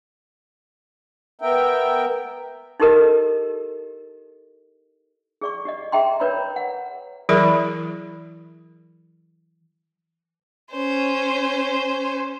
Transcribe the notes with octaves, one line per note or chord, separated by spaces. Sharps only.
B3 A#4 E5 G5
D#4 E4 G4 A4 A#4 D#5
G#4 D5 C#6
G4 D5 D#5
G#4 D#5 E5 G5 A#5 C6
A#4 B4 C#5 D5 A#5 B5
F#5
E3 F#3 E4 G#4 A#4 B5
C#4 C5